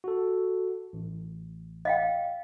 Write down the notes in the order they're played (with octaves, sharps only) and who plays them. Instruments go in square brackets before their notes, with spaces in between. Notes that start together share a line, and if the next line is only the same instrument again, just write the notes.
[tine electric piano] F#4 A4
A1
[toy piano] D#5 F5 G5